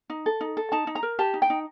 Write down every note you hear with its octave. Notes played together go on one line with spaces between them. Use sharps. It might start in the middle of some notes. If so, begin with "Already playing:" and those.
D#4
A4
D#4
A4
D#4 A5
D#4
A#5
A#4
G4 A5
D#4
G5
D#4